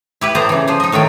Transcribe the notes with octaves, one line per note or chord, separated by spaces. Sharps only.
E4 G4 B4
A2 B3 C5 A#5
C#3 E3
F3 C5
D#4 D#5
A2 D#3 F#3 G5